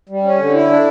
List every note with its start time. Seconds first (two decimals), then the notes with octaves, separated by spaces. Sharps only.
0.09 G3
0.23 C#4
0.39 D3
0.54 E4
0.69 D4